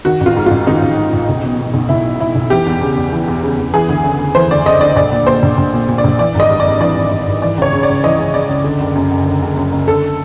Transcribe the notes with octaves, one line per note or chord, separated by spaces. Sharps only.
D#3 F#4
A1
F4
G#2
A1 F4
D#3 D#4
A1
G#2
A1
B1
B2
B2
B1
B1 E4
B2
B2 E4
B1
E3 G4
E2
C#3
E2
E3
E2
C#3
E2
E3 G#4
D2
C#3
D2
E3 C5
D2 D5
C#3 D#5
D2 D5
A#1 D5
A#2
A#2 C5
A#1
A#1
A#2
A#2
D5
A#1
E3 D5
G#1 D#5
G2
D5
G#1
E3 D5
G#1
G2
G#1
E3 D5
C#2 C#5
C#3
D5
C#2
E3 D#5
C#2
C#3 D5
C#2
D3
F#1
F#2
F#1
D3
F#1
F#2
F#1
D3 A4